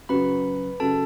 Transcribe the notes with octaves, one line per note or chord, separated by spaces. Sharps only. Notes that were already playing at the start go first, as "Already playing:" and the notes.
F#2 C#3 F#3 B4 B5
F#2 C#3 F#3 A4 A5